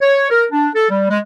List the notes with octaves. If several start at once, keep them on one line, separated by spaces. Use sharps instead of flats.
C#5
A#4
D4
A4
G3
G#3